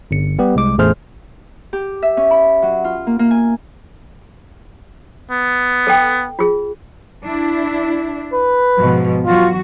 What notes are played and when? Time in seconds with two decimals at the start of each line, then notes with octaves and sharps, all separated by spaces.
0.11 G1 C#7
0.39 G3 B3 G4
0.56 C2 G#3 D6
0.78 A1 E2 A3 G#4 C5 F6
1.73 G4
2.03 E5
2.17 C#4
2.31 B5
2.62 F#3
2.84 F4
3.07 A#3
3.19 A#3
3.31 G#5
5.31 B3
5.87 A4 G5
6.39 F4 G#4
7.25 D4 E4
8.34 B4
8.78 G#2 B2 F3
9.26 E3 F#3 F4 F#4